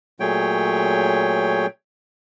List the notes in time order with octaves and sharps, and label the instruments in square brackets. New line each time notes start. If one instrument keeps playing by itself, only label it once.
[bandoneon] A#2 F#3 A3 G#4 C#5 G5